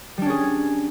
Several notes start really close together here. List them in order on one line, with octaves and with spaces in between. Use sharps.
G3 D4 C#4 G#4